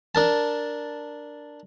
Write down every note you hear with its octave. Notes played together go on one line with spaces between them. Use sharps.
D4 A#4 A5